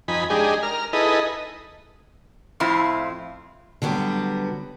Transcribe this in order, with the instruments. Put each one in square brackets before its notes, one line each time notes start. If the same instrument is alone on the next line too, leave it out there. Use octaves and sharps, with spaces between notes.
[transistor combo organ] F2 D#4 G#5 B5
G#3 D4 D#4 G4 G#4
A#4 F6
D#4 E4 G#4 A4 B4 D#5
[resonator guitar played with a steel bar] F2 A2 C4 E4 F4
[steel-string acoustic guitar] D3 F#3 G3 B3